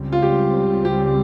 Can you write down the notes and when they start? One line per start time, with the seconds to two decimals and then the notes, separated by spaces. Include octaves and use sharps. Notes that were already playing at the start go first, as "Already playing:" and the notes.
Already playing: C#2 C#3 G3 C4
0.13 F4
0.22 G4
0.85 G4